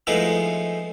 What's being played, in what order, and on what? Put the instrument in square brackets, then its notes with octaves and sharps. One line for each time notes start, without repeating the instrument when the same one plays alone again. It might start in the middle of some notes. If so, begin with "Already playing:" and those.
[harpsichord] F3 G#3 A3 B3 D#4 E4